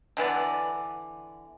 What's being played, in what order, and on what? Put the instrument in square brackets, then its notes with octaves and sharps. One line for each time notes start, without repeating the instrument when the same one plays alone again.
[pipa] D3 E3 B3 D5